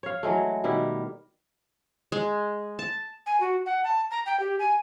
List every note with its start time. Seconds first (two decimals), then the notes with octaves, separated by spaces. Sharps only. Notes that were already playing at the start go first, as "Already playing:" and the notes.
0.03 C#5 F5
0.23 E3 F#3 G#3 A3
0.64 B2 D#3 G3 E4
2.12 G#3
2.79 A5
3.26 G#5
3.40 F#4
3.66 F#5
3.84 A5
4.11 A#5
4.26 G5
4.40 G4
4.59 G#5